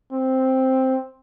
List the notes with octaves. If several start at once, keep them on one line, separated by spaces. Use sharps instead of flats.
C4